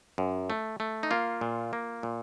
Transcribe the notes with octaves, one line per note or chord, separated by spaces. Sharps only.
F#2
A3
A3
D#4
A#3 F4
A#2
A#3
A#2